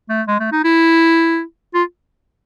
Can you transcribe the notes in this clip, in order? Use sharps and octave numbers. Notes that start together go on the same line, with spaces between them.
A3
G#3
A3
D#4
E4
F4